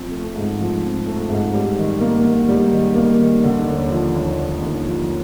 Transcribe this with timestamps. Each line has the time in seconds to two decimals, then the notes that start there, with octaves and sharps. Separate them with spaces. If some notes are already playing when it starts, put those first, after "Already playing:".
Already playing: F3 C4
0.11 A3
0.35 G#2
0.59 F3
0.83 C4
1.07 A3
1.29 G#2
1.54 G3
1.78 D#3
2.01 A#3
2.25 D#3
2.49 G3
2.72 D#3
2.96 A#3
3.20 D#3
3.43 D3
3.68 D#2
3.91 F3
4.15 D#2
4.39 D3
4.62 D#2
4.86 F3